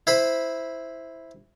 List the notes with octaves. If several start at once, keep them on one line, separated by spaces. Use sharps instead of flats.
E4 C5 B5